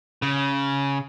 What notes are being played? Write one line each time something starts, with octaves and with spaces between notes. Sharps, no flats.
C#3